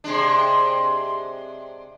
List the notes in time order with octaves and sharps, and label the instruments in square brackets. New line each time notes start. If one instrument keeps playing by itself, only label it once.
[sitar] C3 G#3 D4